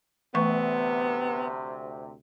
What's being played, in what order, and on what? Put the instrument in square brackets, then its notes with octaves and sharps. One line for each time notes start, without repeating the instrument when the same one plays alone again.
[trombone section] D2 C3 [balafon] E3 A3 C#6 [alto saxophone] B3